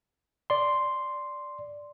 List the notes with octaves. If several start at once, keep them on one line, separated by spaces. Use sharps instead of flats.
D5 C6